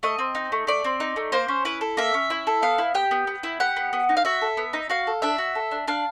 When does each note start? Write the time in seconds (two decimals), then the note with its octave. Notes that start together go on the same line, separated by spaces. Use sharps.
0.03 A3 D#5
0.19 C4
0.35 D#4
0.52 A3
0.67 A3 D5
0.84 C4
1.00 D#4
1.16 A3
1.32 A#3 C5
1.48 C#4
1.65 E4 B4
1.81 A4
1.97 A#3 E5
2.14 C#4
2.30 E4
2.47 A4
2.62 B3 F5
2.78 E4
2.94 G4 G5
3.11 B3
3.27 B3
3.43 E4
3.60 G4 F#5
3.76 B3
3.93 B3
4.09 D#4
4.17 F5
4.25 F#4 E5
4.41 A4
4.57 B3
4.73 D#4
4.90 F#4 F5
5.07 A4
5.22 D4 E5
5.38 F#4
5.55 A4
5.71 D4
5.88 D4 F5